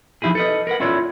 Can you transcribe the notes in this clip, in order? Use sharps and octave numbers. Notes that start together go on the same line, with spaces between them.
F3 D#4 E4 G4 G#4
A4 B4 D#5
A#4 B4 F#5
C#4 E4 F4 A4 C#5 D5